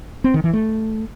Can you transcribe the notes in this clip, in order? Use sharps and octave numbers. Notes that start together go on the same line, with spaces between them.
C4
D#3
E3
A3